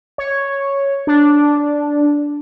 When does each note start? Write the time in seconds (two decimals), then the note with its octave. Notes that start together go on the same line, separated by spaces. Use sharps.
0.18 C#5
1.07 D4